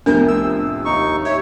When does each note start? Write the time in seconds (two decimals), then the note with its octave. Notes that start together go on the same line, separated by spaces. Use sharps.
0.06 C2 F2 A2 B3 D4 A#4 G6
0.28 E6
0.85 D#2 D#4 C#6
1.25 G4 C#5 E5